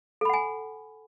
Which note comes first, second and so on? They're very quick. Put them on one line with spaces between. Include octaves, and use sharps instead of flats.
A4 B5 F#5 G#5